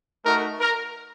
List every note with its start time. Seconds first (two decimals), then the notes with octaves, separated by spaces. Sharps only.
0.23 A3 D#4 F#4 A#4
0.60 A#4